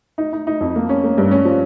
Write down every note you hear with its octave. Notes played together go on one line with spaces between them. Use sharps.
D#4
D#4
D#4
F2
A#3
C#4
A#3
G2
C#4
F3